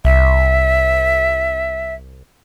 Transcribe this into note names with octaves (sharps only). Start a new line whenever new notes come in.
C2 E5